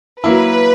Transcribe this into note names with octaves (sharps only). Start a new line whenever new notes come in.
F#3 A#3 E4 B4